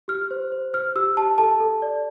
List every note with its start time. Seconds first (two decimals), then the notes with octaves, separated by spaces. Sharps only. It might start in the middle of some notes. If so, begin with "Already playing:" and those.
0.08 G4 F6
0.31 C5
0.52 C5
0.73 C5 F6
0.96 G4 E6
1.17 G4 A5
1.38 A4 A5
1.60 A4
1.82 D5